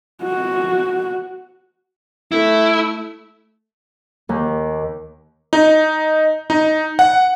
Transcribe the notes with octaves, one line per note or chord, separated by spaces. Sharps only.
F#4
A3 E4
D#2
D#4
D#4
F#5